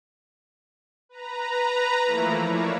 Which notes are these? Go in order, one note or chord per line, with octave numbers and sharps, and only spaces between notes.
B4 A#5
E3 F3 A3 A#3 E4
C#5 D5 E5 F5